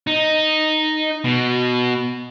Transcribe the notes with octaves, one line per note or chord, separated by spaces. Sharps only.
D#4
B2